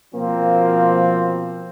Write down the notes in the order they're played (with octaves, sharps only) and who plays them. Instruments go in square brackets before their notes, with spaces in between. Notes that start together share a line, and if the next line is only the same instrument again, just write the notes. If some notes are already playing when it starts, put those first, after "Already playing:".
[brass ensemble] B2 F3 C4 [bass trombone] A#3